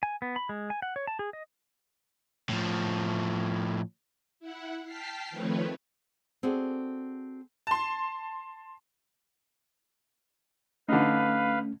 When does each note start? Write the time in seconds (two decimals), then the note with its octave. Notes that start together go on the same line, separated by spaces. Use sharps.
0.03 G#5
0.22 B3
0.36 B5
0.49 G#3
0.70 G#5
0.82 F#5
0.96 C#5
1.07 A5
1.19 G#4
1.33 D#5
2.49 A2 F3
4.40 E4 F#5
4.84 G5 A5 F6 B6 C7
5.30 D#3 F3 A3 C4 B4 C#5
6.43 C4 F#4 G#4 A4 D5
7.67 A5 C6
10.89 D3 A3 C#4 D#4 B4 F5